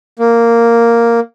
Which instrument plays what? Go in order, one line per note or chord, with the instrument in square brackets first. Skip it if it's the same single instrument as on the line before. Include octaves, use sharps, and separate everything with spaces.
[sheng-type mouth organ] A#3